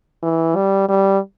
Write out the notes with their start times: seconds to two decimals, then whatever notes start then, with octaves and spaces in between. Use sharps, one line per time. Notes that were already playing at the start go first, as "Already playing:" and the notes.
0.23 E3
0.56 G3
0.89 G3